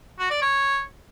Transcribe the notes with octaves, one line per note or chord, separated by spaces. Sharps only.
F#4
D5
C#5